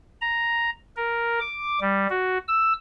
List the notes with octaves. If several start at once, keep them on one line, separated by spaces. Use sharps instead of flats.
A#5
A#4
D6
G3
F#4
E6